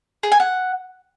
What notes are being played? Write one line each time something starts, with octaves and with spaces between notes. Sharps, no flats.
G#4
G#5
F#5